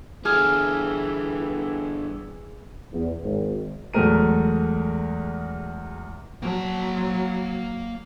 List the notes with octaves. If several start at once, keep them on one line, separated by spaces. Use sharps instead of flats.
D3 E3 G3 G#4 F6
E2
G#1
E2 F#3 G#3 A3 A#4 D#7
F#3 A#3 A5